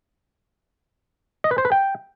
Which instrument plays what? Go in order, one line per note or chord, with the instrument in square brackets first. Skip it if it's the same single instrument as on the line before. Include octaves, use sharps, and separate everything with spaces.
[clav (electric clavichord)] D#5
B4
C5
B4
G5